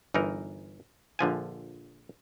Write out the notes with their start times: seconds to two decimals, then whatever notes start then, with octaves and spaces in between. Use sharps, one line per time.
0.14 G1 E3 D#4 A#4
1.19 A#1 D3 F3 G#5